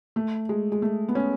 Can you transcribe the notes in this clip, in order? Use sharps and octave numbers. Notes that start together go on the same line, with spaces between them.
A3
G#3
G#3
A3
B3
C#4